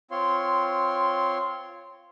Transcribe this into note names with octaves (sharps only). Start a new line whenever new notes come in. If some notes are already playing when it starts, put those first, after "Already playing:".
C4 F4 C#5 C6